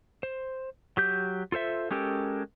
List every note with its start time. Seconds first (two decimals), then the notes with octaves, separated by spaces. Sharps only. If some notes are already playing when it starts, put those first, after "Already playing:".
0.23 C5
0.97 F#3 G4 G6
1.52 F4 A4 C5 E5
1.91 G#3 C#4 G4 A4 A#4